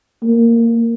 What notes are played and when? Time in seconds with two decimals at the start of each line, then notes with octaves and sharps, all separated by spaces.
0.23 A#3